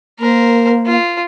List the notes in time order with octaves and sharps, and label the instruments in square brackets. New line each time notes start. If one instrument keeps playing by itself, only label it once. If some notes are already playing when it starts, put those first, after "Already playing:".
[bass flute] A#3 [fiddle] A#4 C5
[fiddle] F4